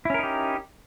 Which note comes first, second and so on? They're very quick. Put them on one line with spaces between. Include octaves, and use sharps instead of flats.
E4 C#4 A#4 D#4 G4